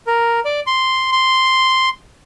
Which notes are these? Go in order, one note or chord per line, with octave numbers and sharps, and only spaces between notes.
A#4
D5
C6
C6